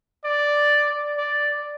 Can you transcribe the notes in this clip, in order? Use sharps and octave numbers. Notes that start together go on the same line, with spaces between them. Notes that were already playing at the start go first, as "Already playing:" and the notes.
D5
D5